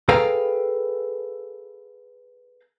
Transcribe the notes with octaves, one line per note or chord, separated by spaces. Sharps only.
G#4 A4 B4 F5 G5 A#5